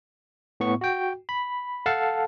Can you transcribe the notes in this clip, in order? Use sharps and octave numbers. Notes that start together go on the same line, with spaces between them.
A2 B3 C#6
F#4 G5
B5
A4 F5 F#5 A5